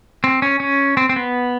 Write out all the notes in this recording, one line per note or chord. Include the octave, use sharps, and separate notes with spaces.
C4
C#4
C#4
C4
C4
B3